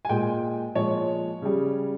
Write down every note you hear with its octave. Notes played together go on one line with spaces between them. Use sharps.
G#5
A#2 G#3 G5
A#2 F3 G#3 C#5
C#3 G3